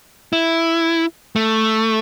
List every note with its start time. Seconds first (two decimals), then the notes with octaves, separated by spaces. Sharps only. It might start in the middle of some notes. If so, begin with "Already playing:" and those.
0.33 E4
1.36 A3